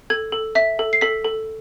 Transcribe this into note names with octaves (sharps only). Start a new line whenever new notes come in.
A4 G#6
A4
E5 B6
A4
C7
A4 B6
A4